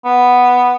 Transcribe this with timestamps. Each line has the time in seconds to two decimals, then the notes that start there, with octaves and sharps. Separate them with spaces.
0.05 B3